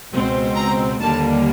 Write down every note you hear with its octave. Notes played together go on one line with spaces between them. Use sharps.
C#2 B2 G#3 C4
A#5
D#2 D3 G3 A#3 A5